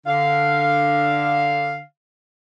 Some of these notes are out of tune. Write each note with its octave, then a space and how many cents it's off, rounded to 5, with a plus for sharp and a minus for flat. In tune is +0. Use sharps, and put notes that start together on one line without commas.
D3 +5 F5 +0